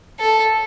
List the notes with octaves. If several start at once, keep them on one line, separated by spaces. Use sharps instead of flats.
A4